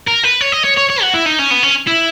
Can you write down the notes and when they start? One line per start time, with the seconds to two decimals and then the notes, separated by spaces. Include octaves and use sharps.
0.08 A#4
0.24 B4
0.41 C#5
0.52 D#5
0.65 C#5
0.77 C#5
0.90 C#5
1.02 F#4
1.14 E4
1.26 D#4
1.39 C#4
1.50 B3
1.63 C#4
1.87 E4